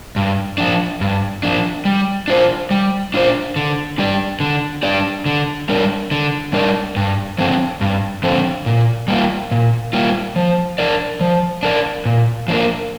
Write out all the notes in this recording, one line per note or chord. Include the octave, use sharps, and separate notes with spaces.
G2
F3 D4
G2
F3 D4
G3
D4 F4 C5
G3
D4 F4 C5
D3
G3 D4 G4 D5
D3
G3 D4 G4 D5
D3
G3 D4 A#4 D5
D3
G3 D4 A#4 D5
G2
D3 F3 C4
G2
D3 F3 C4
A#2
G3 A#3 F4
A#2
G3 A#3 F4
F3
D4 A#4 D5
F3
D4 A#4 D5
A#2
F3 A#3 D4 A#4